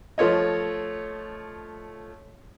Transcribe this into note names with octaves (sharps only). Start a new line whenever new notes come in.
F3 A3 F4 C#5 D#5